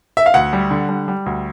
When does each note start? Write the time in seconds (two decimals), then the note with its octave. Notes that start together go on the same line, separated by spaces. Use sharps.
0.17 E5
0.26 F5
0.34 D2 F#5
0.53 G3
0.71 D3
0.89 G3
1.08 G3
1.26 D2